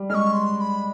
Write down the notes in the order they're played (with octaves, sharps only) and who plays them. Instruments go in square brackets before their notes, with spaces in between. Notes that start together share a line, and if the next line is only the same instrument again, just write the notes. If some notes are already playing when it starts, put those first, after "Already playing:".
Already playing: [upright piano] G3
[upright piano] G#3 [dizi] F6
[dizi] C#6
C6
C6
B5